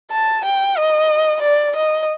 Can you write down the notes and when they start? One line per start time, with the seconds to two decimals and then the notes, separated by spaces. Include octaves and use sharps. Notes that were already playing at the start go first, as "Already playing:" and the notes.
0.11 A5
0.45 G5
0.77 D#5
1.42 D5
1.76 D#5